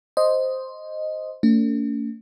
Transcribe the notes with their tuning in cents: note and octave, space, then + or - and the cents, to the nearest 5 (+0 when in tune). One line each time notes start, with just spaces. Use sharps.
C5 +0 D#5 +0
A3 +45 C#4 +45